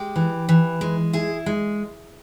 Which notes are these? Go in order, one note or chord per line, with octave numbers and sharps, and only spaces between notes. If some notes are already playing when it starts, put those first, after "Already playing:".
Already playing: G#3 G4
E3
E3
G#3
E4 G#4
G#3